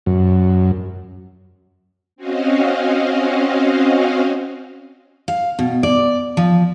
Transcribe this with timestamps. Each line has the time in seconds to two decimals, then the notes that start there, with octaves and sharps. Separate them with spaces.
0.06 F#2
2.16 C4 C#4 F#4 D#5 F5
5.28 F5
5.59 B2
5.83 D5
6.37 F3